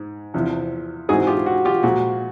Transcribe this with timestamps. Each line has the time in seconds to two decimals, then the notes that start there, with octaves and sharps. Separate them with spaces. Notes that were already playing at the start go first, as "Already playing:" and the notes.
Already playing: G#2
0.34 E2 C3 F3
1.09 G#2 E3 G#3 C4 D#4 F#4 G#4
1.27 F4 G4
1.46 F#4
1.65 F4 G4
1.83 A#2 F3 G#3 F#4